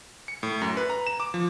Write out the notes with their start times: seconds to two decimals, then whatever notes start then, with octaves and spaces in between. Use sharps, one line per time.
0.28 C#7
0.43 A2
0.61 F#2
0.77 B4
0.90 A#5
1.07 E7
1.20 D6
1.34 F3